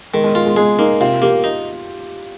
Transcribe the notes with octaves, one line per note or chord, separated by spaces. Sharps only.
D#3 G#3
G#3
G#3 F4
G#3
G#3 G#4
A#3 D#4
C3 F4
A#3 G4
D#4